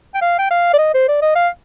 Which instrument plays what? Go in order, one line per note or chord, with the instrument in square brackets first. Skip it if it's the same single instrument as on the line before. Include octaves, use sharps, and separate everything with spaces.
[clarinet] G5
F5
G5
F5
D5
D#5
C5
D5
D#5
F5